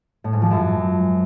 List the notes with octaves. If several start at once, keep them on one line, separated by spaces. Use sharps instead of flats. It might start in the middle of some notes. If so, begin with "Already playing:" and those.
A2
G#2
F3
F#2